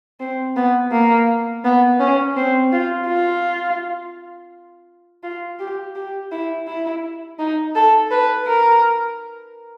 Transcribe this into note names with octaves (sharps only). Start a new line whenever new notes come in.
C4
B3
A#3
B3
C#4
C4
F4
F4
F4
G4
G4
E4
E4
D#4
A4
B4
A#4